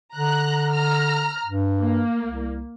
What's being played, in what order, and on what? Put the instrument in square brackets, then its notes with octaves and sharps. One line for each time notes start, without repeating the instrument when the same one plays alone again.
[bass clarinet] D3 [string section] A#5 F#6
[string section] A#5 F6
[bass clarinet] G2
[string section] A#3
[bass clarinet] C2